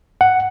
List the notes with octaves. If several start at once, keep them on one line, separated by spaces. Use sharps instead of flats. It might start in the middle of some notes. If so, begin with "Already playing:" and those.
F#5